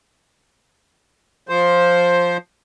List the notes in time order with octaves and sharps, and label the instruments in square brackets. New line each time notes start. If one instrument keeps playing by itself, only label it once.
[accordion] F3 C5